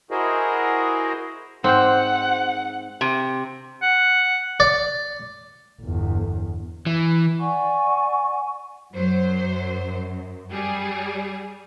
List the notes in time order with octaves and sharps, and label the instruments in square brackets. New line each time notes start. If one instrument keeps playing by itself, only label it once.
[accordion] E4 F#4 G#4 A#4 C5 D#5
[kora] G#2 C5 [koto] C4 [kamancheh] F#5
[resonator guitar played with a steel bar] C3
[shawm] F#5
[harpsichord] D5
[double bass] G1 E2
[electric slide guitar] E3
[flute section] D5 F#5 G#5 C#6
[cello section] F#2 [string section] F#3 C5
[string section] G3 G#4